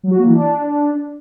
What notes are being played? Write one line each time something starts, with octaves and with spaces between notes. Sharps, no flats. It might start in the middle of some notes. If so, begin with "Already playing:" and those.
F#3
F#4
A#3
E3
D4